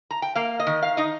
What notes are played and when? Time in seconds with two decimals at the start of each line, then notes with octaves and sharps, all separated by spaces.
0.11 A#5
0.22 G5
0.35 A#3 F5
0.60 D#5
0.67 D#3
0.82 F5
0.97 D#4 D#5